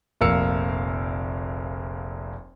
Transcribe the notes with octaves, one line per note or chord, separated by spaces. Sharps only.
F1 A#1 A#4 F5 E6 C#7